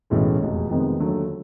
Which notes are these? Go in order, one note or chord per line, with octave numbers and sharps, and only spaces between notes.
B1 A2 E3 G#3 C#4
F1 E2 B2 G#3
F2 C3 D#3 G#3 B3
D#2 D3 F#3 A3